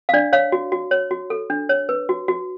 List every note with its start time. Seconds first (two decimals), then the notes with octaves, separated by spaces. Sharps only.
0.09 F5
0.13 D4 D5
0.33 C#5 F5
0.52 F#4
0.72 F#4
0.91 C#5
1.11 F#4
1.30 A4
1.50 D4
1.69 C#5
1.89 B4
2.09 F#4
2.28 F#4